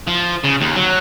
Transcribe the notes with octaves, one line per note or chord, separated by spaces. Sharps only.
F3
C#3
D#2
F#3